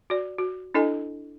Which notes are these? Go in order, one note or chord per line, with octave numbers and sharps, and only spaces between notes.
F#4 D5
F#4
D4 E4 A4 D#5 G#5